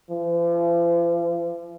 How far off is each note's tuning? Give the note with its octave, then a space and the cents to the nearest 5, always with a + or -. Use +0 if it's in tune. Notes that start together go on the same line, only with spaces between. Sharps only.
F3 -40